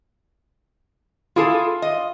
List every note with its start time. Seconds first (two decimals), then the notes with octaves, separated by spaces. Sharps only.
1.36 E4 F4 G#4 A4
1.82 D#5